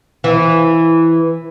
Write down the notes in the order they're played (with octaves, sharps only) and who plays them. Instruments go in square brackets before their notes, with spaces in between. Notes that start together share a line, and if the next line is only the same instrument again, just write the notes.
[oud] E3